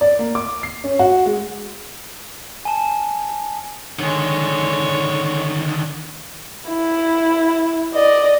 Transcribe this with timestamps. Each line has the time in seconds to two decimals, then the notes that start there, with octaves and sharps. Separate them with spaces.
0.01 D5
0.19 A#3
0.35 D6
0.63 C7
0.84 C#4
0.99 F#4
1.26 G#3
2.65 G#5 A5
3.99 D3 D#3 G#3 C#5
6.69 E4
7.94 D5 D#5